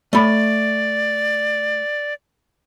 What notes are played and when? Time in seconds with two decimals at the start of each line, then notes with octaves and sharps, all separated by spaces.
0.13 A3 D5 B5